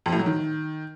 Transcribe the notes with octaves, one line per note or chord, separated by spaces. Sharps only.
F2
A2
F#3
D#3